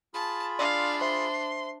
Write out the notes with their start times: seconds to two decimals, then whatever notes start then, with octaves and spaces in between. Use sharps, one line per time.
0.14 F4 G#4 A5 B5
0.59 D4 D5 F5 C6
1.01 C5 E5 A5 C6